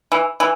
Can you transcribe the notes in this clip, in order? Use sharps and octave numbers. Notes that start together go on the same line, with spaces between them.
E3
E3